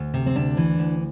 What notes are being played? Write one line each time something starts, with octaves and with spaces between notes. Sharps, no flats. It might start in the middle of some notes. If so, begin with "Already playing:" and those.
Already playing: D2
C3
C4
D2 D4
E3
D2